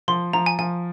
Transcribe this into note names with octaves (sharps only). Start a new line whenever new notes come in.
F3 C6
F3 A#5
G#5
F3 G#5